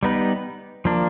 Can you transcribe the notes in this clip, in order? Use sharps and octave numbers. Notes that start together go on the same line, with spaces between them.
G3 B3 D#4 G4 B4
F3 A#3 D4